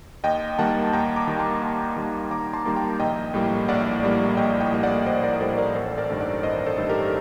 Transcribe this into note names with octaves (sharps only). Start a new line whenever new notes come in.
D#2 D#5 G5
D#3 G3 A#3 F#5 A5
D#2 G5 A#5
A#5 D6
D#3 G3 A#3
A5 C6
D#2
D#3 G3 A#3
D#2 A#5 D6
A5 C6
D#3 G3 A#3
G5 A#5
A#1 D#5 G5
A2 G3 A#3
A#1 D5 F#5
A2 G3 A#3
A#1 D#5 G5
D#5 G5
A2 G3 A#3
D5 F#5
A#1 C5 D#5
A#4 D5
A#4
A2 G3 A#3 A4 C5
A#4 D5
A1 A4 C5
A#4 D5
G2 D#3 A3
D5 F#5
A1 C5 D#5
A4 C5
G2 D#3 A3
G4 A#4